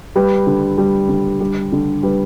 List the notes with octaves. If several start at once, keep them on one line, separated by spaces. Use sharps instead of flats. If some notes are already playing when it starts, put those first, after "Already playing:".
G3 B4
D3
G3
D3
G3 G4
D3
G3 B4